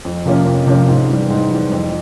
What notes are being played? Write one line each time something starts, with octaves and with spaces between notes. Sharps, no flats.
F2
C3 F3 A#3 C#4
F2
C3 F3 A#3 C#4
G#2
E3 G3
G#2
E3 G3
F2